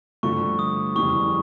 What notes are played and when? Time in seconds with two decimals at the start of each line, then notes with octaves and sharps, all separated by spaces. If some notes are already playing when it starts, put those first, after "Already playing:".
0.23 G2 D3 F3 A3 C#6
0.59 D#6
0.95 F2 C#3 E3 G3 C#6